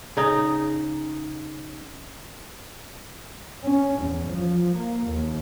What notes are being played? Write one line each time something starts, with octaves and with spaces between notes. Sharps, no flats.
C#3 D#4
C#4
E2
F3
A#3
D#2